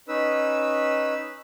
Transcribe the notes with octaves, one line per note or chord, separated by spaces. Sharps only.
C#4 D#4 B4 E6